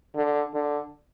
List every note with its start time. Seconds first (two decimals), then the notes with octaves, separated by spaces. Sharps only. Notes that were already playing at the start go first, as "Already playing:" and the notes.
0.16 D3
0.54 D3